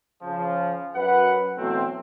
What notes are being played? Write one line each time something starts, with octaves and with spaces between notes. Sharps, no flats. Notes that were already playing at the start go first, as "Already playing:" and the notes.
C#3 F3
F#2 B4 F#5
B2 E3 F#3 A3 C4